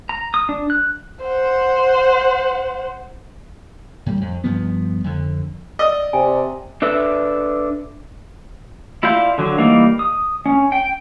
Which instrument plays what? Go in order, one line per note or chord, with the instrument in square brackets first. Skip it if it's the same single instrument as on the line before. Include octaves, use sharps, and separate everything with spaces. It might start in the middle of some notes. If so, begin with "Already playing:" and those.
[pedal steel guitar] A#5
D#6
D4
F#6
[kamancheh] C5 F#5
[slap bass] A2 G3
F2
G2 F3 B3
F2 D3
[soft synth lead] D5 [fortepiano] D#5 [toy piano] E6
[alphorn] C3 [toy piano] G5 G#5
[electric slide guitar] D4 A4 B4 E5
[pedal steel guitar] E4 F4 D5 F5 G6
D3 F#3
E3 G3 A#3 D#4
D#6
C#4
G5